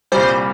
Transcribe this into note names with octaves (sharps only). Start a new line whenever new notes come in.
C2 A#2 G3 C5